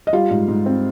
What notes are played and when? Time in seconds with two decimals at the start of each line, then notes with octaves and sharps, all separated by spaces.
0.07 D#5
0.13 G3 F4 F5
0.31 G#2
0.48 G#2
0.66 C4